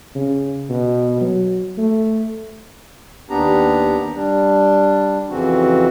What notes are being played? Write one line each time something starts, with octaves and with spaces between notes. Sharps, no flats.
C#3
B2
F#3
A3
D#2 B3 D4 G4 A#5
G3 D4
F2 C#3 E3 C4 F#4